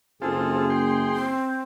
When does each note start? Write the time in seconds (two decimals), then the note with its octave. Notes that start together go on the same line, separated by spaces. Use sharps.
0.22 F#1 C4 F4 G#4 A4
0.70 G5 C6
1.15 C4